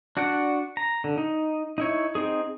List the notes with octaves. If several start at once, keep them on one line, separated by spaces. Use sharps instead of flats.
D4 F#4 D5 F#5
A#5
D3
D#4
D#4 E4 C#5
C4 D#4 G#4